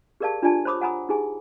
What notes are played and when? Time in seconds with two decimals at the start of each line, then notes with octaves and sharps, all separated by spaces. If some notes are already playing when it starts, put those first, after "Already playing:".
0.20 G4 G#4 A#4 D5 F5 A5
0.42 D4 F4 G4 D5 G#5 A5
0.65 C5 C#5 B5 D6 D#6
0.81 F#5 G#5 A#5 B5 D#6
1.09 D#4 G4 G#4 G#5